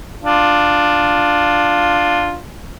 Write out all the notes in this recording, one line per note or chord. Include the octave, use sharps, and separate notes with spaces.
D4 F4